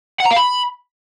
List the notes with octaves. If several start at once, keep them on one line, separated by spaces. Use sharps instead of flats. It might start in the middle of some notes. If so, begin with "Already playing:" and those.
F#5
A#5
F5
B5